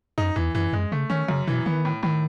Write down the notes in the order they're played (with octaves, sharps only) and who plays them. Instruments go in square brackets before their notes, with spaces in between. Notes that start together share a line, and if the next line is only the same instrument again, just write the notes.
[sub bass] F#2 [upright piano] D#4
[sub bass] E2 [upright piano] E3
[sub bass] F#2 [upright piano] E3
[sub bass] F#2 [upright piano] G#3
[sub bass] C#3 [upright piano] A3
[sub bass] D#3 [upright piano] C#4
[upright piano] F#2 [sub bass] C#3
[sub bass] B2 [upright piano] E3
[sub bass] D#3 [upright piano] B3
[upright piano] A2
[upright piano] A2 [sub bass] D#3